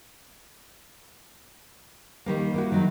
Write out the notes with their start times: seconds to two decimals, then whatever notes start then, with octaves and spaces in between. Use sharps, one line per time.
2.26 D#3 G3 A#3
2.54 A#3 E4 F#4
2.72 D#3 F#3